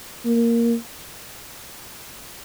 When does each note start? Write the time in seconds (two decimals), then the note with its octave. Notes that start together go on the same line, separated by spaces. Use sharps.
0.25 A#3